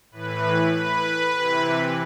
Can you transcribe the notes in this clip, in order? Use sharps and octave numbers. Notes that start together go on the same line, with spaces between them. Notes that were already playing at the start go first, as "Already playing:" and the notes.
A2 E3 B4
B4
C3 E3